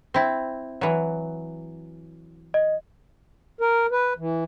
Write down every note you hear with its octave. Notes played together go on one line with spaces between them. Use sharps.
C4 E4
E3 F#3
D#5
A#4
B4
E3